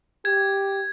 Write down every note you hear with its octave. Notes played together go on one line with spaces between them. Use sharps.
G4 G#6